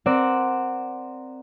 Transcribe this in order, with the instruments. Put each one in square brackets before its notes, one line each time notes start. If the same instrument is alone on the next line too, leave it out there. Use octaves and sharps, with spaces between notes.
[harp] C4 A#4 D5 F#5